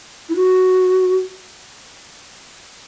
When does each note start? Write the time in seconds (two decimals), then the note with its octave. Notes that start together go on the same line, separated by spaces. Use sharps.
0.29 E4
0.36 F#4